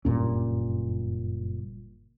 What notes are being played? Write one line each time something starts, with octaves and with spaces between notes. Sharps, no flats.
F#1 G2 A#2 C#4